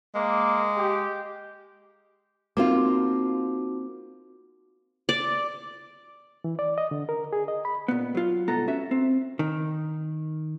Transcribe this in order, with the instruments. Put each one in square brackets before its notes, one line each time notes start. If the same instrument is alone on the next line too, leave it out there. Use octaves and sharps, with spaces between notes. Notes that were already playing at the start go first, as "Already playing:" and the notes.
[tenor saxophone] G#3 [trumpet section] A#3 D6
[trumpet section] G4
[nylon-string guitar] A#3 C4 F4 [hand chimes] D#4 F#4 D6
[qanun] D5
[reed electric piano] E3
D5
D#5
D3
A#4
G#4
D#5
B5
[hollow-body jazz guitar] A#2 B3
F#3 F4
C2 G#2 B3 A4 A#5
C#4 F#4 E5
C4
D#3